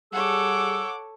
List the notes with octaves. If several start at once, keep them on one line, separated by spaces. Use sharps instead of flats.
G3 G#4 A4 C#5 F#5 D6 E6